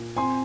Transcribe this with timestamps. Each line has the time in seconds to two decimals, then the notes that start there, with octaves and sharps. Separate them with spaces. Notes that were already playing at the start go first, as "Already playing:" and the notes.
Already playing: A#2
0.17 C4 G#5 C6